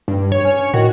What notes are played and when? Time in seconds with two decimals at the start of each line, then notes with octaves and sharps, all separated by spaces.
0.08 G2
0.32 C#5
0.44 C#4
0.74 A2 D#3 F#4